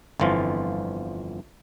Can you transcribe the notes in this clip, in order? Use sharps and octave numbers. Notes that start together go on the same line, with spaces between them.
G1 F2 E3 F3 F4